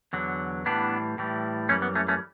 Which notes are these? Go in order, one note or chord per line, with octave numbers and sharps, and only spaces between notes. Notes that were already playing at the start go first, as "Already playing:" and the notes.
E2 D3 F#3
A2 E3 G3 B3 D4
A2 E3 G3
F#2 E3 G3 A3 C#4
B3
A3 C#4
A3 C#4